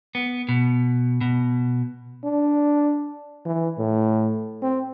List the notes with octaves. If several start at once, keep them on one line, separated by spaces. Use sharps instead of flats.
B3
B2
B2
D4
E3
A2
C4